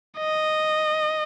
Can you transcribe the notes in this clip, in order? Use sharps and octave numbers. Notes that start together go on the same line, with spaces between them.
D#5